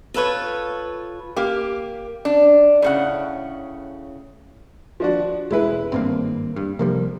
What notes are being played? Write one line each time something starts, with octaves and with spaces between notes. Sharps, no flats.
F4 A4 B4 C#5
A#3 G4
D4
A2 C#3 F#5
F3 D4 F#4
E1 G#3 E4 B4
G#1 G2 A#3 C4
G2
C3 F3 G3 A#3